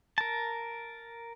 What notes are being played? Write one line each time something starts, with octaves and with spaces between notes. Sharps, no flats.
A#4 A5